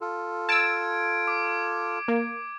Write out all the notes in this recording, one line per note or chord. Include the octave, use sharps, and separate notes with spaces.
F4 A4
A5 E6 G#6 D7
D6
A#3